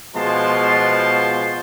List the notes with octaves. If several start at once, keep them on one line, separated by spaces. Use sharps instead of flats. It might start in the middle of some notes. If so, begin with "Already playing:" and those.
B2 F3 G#3 A5 C6